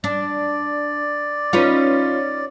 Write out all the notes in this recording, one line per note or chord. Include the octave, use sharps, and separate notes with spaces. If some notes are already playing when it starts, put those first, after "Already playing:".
D4 D5
C#4 D#4 F4 B4